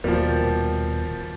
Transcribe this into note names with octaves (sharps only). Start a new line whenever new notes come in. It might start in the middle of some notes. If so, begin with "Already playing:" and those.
D#1 B2 F3 G3 A#3